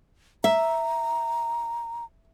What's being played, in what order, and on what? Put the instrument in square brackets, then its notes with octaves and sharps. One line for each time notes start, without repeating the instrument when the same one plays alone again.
[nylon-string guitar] E5 [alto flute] A#5